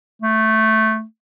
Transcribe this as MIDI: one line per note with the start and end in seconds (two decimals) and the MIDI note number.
0.22 1.04 57